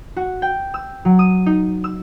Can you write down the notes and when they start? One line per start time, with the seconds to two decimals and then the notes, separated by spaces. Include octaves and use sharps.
0.16 F#4
0.42 G5
0.74 E6
1.05 F#3
1.19 D#6
1.46 D#4
1.84 E6